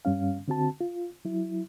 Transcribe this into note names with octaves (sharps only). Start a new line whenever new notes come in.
G2 G3 C#4 F5
D3 C4 F#4 A5
F4
F#3 E4